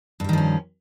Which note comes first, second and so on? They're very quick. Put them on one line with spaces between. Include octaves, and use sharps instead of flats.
G2 G3 D#3 F3 C#4